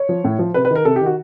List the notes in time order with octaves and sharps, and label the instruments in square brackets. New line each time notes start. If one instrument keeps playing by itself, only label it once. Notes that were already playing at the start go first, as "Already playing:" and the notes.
Already playing: [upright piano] C#5
F3
A2
F3
C3 B4
B4
D#3 A#4
C3 A4
G4
D#3 F#4